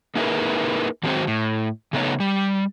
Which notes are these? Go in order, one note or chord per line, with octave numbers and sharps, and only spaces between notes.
A#3 D#4 E4 G#4 A#4 B4
D#3 F#3 G#3 C4 F#4 C5
A2
C#3 A3 B3 D#4 C#5
G3